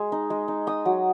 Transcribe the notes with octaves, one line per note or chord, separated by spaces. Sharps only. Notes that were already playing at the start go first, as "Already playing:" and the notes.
Already playing: G#3
D#4
G#3
D#4
D#4 D#6
F#3